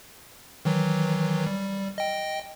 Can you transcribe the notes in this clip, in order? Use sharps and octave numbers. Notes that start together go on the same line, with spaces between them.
D#3 E3 F#3
G3
D#5 G5